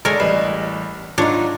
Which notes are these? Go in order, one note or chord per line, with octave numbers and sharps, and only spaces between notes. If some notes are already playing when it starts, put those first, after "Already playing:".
D3 G#3 A#4 C#5 G#5 A6
A1 G3 B4 D#5 C7 E7
G#2 F#3 D4 D#4 F4 C#5